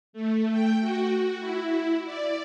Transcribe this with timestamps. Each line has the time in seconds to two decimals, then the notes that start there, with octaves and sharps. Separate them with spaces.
0.13 A3
0.51 G5
0.81 F#4
1.40 E4
2.04 D5